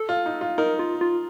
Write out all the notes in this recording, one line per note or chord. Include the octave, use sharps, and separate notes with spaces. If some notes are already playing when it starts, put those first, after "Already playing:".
Already playing: A4
F4
D#4
F4
D#4 A#4
F4
F4